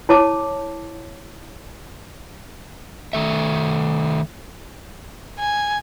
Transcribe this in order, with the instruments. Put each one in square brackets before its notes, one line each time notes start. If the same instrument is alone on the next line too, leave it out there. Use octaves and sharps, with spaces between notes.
[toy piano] E4 C#5 A5 D6
[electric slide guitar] D#3 A3 E5
[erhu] G#5